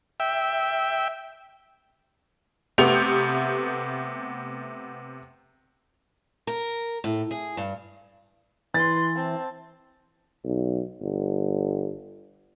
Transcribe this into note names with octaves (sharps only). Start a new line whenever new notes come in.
E5 G5
C3 A3 B3 G4 F7
A#4
A2
G#4
G2
E3 B4 C6 A6
C4 A5
B1
G1